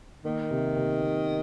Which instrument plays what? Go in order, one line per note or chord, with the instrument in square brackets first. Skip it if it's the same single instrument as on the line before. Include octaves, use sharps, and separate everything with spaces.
[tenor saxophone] D#3 [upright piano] A#3
[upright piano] C3
C3
C3